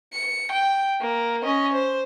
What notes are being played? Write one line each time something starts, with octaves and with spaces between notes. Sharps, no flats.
C#7
G5
A#3
C#4 D#5
C5